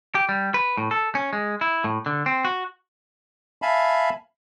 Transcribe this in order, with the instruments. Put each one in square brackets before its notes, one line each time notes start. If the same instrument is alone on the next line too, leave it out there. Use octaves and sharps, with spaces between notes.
[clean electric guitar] G4
G3
B4
A2
A4
C#4
G#3
E4
A2
D3
C4
F#4
[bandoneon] E5 F5 G#5 A5 B5